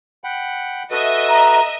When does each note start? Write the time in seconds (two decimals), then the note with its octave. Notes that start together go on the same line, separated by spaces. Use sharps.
0.24 F#5 G5 B5
0.91 F#4 A4 B4 D#5 E5
1.28 A#5